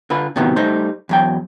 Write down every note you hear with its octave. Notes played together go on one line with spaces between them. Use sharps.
D3 F4 B4
A2 C3 D#3 E3 F#3 B3
G3 A3 D#4 C5
E2 F#3 G5